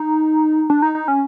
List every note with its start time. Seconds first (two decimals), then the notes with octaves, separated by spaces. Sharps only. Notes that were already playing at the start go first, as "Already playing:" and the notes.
Already playing: D#4
0.70 D4
0.82 D#4
0.95 D#4
1.08 C#4